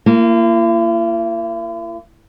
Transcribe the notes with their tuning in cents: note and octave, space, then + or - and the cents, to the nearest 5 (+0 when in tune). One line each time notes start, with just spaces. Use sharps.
A#3 -15 E4 +45